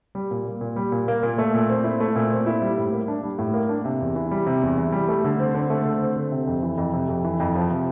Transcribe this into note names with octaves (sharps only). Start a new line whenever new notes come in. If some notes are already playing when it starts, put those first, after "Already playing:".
G3
A#2
A#3
A#2
G3
A#2
A#3
A#2
A3
A#2
C4
E4
A3
A#2
C4
E4
G3
A2
A#3
D4
G3
A2
A#3
D4
C3
E2
E3
G3
C3
E2
E3
G3
A3
D3
C4
D3
A3
D3
C4
D3
C3
F2
E3
F2
C3
F2
E3
F2
F3
C3